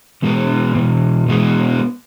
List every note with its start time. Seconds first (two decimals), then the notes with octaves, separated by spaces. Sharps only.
0.22 E2 B2 G#3 B3
0.74 E2 B2
1.28 E2 B2 G#3 B3